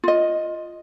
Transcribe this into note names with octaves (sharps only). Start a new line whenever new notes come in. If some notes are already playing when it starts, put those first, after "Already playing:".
F4 D#5